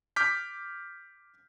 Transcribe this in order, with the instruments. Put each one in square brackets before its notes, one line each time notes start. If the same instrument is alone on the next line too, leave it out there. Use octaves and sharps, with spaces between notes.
[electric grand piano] D6 F6 G6 B6